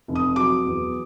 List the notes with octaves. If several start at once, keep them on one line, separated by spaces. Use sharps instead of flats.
F1
D#6
F#3 D6
E2